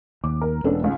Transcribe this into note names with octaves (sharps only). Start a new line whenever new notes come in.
D#2 D6
A#4
E1 B3 C#4 D4 A4
C#2 G#2